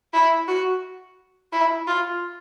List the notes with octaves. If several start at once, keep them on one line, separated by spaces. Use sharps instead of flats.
E4
F#4
E4
F4